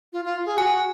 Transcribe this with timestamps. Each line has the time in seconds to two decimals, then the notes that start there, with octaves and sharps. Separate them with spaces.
0.13 F4
0.25 F4
0.46 G#4
0.57 F#4 G#5